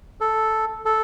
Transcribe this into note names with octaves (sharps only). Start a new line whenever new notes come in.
A4
A4